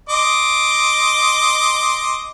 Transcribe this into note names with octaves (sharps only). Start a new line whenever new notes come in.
D#5 C6 D6